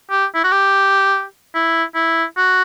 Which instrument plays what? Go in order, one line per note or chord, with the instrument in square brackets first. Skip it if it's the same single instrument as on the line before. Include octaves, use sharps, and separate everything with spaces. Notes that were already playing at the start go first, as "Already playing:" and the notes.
[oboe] G4
E4
F#4
G4
E4
E4
F#4